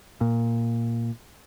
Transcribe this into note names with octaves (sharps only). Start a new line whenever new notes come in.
A#2